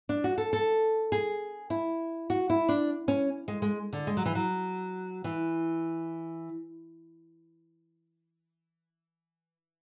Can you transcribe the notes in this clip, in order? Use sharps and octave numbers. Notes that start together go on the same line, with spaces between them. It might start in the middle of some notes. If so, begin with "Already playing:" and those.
D4
F#4
A4
A4
G#4
E4
F#4
E4
D4
C#4
G#3
G#3
D3
G#3
F#3
E3
F#3
E3